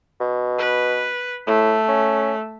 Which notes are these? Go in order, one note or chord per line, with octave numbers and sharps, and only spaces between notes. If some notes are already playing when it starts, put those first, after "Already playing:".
B2
B4
A2 A3
C#4